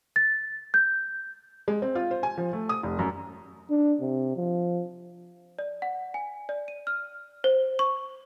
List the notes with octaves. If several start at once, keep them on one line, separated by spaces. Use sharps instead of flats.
A6
G6
G#3
C4
F4
C5
G#5
F3
A3
D#6
F1
F#2
D4
C3
F3
D5
F#5
G#5
D5
D#7
F6
C5
C#6